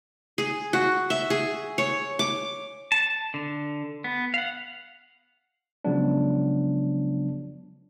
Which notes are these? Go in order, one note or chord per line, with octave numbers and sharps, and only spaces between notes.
G#4
F#4
E5
G#4
C#5
D6
A5
D3
B3
F5 F#5
C#3 F3 F#3 G#3 B3 D4